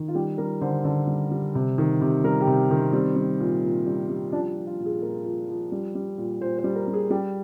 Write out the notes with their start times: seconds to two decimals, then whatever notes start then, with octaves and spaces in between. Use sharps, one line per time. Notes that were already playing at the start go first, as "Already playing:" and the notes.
Already playing: D#3
0.08 F4
0.15 G3 G4
0.38 G3 A#4
0.61 D3 C5
0.84 D3 C5
1.07 G3
1.31 G3
1.55 C3
1.78 D#3
2.01 C3
2.24 G3 A#4
2.41 G4
2.47 C3
2.71 D#3
2.76 C4
2.93 G3 C4
3.16 G3
3.40 A#2
3.63 A#2
3.86 G3
4.10 G3
4.32 F3 D4
4.56 F3
4.67 F4
4.79 A#2
4.85 G#4
5.02 A#2 A#4
5.25 F3
5.48 F3
5.72 G3
5.95 G3
6.18 A#2
6.41 A#2 C5
6.58 C5
6.64 G3
6.76 A#4
6.88 G3
6.93 G#4
7.10 G3 G4